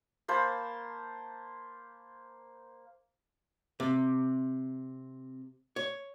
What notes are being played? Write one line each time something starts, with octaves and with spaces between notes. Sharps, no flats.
A#3 C5 A5 B5
C3
C#5